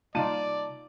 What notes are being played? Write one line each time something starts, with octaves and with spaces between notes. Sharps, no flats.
C3 G3 A#3 D#4 F4 D5 A5 D#7